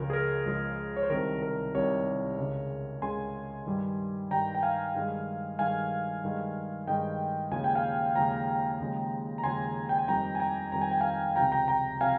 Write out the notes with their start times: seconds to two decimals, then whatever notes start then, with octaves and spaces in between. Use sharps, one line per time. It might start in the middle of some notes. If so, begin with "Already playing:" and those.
Already playing: C#2 C#3 F3 G#3 A#4
0.10 G#4
0.13 A#4
0.46 C#2 C#3 F3 G#3
0.96 C#5
1.03 C5
1.10 C2 C3 D#3 A#4
1.42 A#4
1.74 C2 C3 D#3 A#4 C#5
2.38 C#2 C#3 G#3
3.02 C#2 C#3 G#3 G#5 C6
3.66 G2 D#3 G3
4.30 G2 D#3 G3 G5 A#5
4.55 G5
4.63 F5 G#5
4.95 G2 D#3 G#3
5.59 G2 D#3 G#3 F5 G#5
6.24 G2 D#3 G#3
6.87 G2 D#3 G#3 D#5 G5
7.51 D#2 C#3 F3 G#3 G#5
7.64 G5
7.75 F5 G#5
8.15 D#2 C#3 F3 G#3 G5 A#5
8.80 D#2 C#3 F3 G#3
9.38 A#5
9.44 D#2 C#3 F3 G#3 G#5 C6
9.89 G5
9.98 G#5
10.08 F2 D#3 G3 G5 A#5
10.35 G#5
10.40 G5 A#5
10.72 F2 D#3 G3 A#5
10.82 G#5
10.91 G5
11.01 F5 G#5
11.36 C#2 C3 F3 G5 A#5
11.52 G5 A#5
11.68 G5 A#5
12.00 C3 F3 F5 G#5